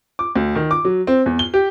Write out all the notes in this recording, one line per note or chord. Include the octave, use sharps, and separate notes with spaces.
D6
D2
D#3
D6
F#3
C4
E2
G7
G4